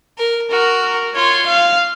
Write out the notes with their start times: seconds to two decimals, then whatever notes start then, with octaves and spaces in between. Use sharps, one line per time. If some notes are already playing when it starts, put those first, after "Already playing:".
0.18 A#4
0.50 F#4 A#4
0.83 A#4
1.15 F4 C#5
1.47 F5